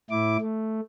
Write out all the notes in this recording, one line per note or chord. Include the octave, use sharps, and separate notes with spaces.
A2 E4 D6
A3